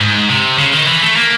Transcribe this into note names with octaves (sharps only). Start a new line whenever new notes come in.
G#2
C3
C#3
D#3
E3
A3
A#3